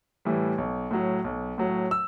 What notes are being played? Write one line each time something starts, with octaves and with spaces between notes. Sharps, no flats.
A2 E3 G3
B1
A2 F#3
B1
A2 F#3
E6